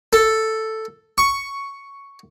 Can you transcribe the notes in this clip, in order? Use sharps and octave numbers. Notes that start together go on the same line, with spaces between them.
A4
C#6